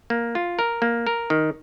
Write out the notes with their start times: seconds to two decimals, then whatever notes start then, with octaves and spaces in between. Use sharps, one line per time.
0.10 A#3
0.35 F4
0.59 A#4
0.82 A#3
1.07 A#4
1.30 D#3